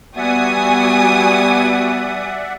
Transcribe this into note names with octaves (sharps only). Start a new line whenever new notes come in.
G3 B3 F#4 D5 E5 F#5 G#5 D#6